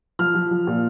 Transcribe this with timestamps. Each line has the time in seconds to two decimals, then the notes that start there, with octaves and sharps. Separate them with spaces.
0.19 F3 F6
0.35 F3
0.51 F3
0.67 A#2